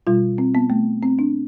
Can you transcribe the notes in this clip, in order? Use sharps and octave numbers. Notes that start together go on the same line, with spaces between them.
B2 G3 F4
C4
B3
A3
C4
D4